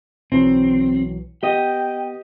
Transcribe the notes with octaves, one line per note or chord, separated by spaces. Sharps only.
B1 E3 F#3 C4
B3 G4 D#5 G5 D#6